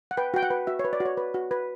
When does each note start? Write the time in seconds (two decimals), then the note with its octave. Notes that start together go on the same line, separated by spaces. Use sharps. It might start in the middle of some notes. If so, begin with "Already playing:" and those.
0.11 F#5
0.17 B4 G5
0.34 F#4 G5
0.43 F#5
0.50 B4
0.67 F#4 E5
0.79 C#5
0.85 B4
0.93 D5
1.00 F#4
1.05 C#5
1.17 B4
1.34 F#4
1.51 B4